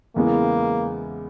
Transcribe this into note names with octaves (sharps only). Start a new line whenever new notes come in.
E2 C#3 E3 G#3 A#3 B3